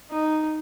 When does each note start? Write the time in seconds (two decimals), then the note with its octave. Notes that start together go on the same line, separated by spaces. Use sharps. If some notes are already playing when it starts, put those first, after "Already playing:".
0.10 D#4